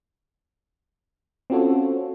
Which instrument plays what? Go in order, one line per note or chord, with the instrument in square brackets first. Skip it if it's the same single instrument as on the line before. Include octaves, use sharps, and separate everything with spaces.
[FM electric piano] C4 C#4 F4 F#4 A4 C#5